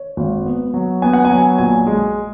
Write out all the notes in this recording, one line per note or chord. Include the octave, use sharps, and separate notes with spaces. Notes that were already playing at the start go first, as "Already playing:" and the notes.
Already playing: C#5
G#1
B3
F#3
B3 G#5
F#5
G#5
F#3
A#1 G#5
G#3